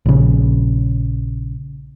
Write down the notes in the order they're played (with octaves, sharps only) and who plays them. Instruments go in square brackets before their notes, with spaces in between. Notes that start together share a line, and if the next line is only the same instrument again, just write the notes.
[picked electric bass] A#1 C#3